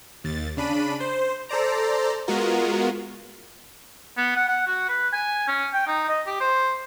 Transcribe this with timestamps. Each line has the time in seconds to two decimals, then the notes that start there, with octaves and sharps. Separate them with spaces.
0.24 D#2 A6
0.57 C#3 D4 B5 D#7
1.00 C5
1.49 A4 C5 D5 A#5
2.28 G#3 B3 F4 F#4 A#4
4.17 B3
4.36 F#5
4.48 F#5
4.67 F#4
4.89 B4
5.13 G#5
5.48 C#4
5.74 G5
5.87 D#4
6.09 D#5
6.27 G4
6.40 C5